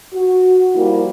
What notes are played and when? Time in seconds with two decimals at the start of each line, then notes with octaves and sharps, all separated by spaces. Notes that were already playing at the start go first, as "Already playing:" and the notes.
0.13 F#4
0.75 F3 G3 A#3 E4